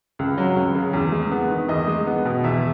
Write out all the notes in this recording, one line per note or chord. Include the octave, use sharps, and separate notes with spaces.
C#2
F#3
C#2
C#3
E2
G#3
B3
D#3
E2 D#5
G#3
B3
B2
E2 E5